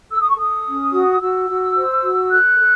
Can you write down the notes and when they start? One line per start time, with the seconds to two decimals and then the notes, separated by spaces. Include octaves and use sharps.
0.11 A4 E6
0.20 D#6
0.28 C#6
0.37 A4 D#6
0.66 C#4
0.93 F#4
1.20 F#4 E6
1.49 F#4
1.75 C5
2.03 F#4
2.30 A4 F#6
2.58 A4